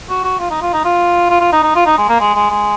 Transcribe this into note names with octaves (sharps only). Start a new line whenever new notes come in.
F#4
F#4
F4
D#4
F4
D#4
F4
F4
F4
D#4
D#4
F4
D#4
G#3
A#3
G#3
G#3
G#3